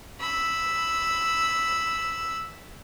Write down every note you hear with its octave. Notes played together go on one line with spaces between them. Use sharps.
B5 E6